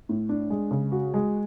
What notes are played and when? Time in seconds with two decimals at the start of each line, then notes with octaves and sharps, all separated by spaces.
0.09 A2
0.29 D4
0.50 G#3
0.71 C#3
0.92 F#4
1.14 G#3